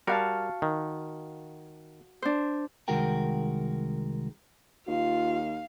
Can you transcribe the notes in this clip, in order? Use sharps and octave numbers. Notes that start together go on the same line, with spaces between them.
G3 F#4 A#4 F5 A5
D#3
D4 C5
C2 D#3 G#3 F#4 A#4 G5
D#2 F4 F5